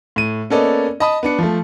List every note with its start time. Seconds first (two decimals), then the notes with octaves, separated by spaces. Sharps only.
0.16 A2 D#7
0.50 A#3 B3 C#4 A4 D5 D#5
1.00 D#5 A5 B5 D#6
1.23 B3 D4 C#7
1.39 F3 A3